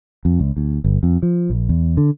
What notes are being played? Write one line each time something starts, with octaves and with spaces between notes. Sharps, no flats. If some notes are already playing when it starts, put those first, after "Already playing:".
F2
C#2
D2
G1
F2
F3
A#1
E2
D3